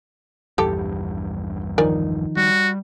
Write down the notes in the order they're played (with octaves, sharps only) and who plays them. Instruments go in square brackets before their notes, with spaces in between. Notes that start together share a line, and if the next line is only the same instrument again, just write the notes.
[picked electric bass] A#1 E2 G2 [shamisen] G4 A4
[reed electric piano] D#3 F3 D#4 [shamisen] A#4 D5 G#5
[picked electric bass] G3 [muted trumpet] F#4